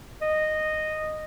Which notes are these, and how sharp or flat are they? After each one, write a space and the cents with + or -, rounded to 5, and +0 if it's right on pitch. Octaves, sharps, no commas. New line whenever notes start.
D#5 -10